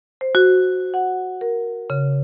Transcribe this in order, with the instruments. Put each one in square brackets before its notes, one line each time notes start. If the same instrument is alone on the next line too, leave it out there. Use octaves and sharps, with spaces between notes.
[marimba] C5
F#4
F#5
A#4
C#3